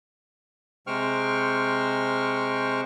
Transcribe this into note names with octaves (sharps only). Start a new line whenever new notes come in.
C3 G#3 C5 G5 C#6 F6